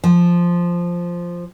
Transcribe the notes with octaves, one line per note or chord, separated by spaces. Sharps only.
F3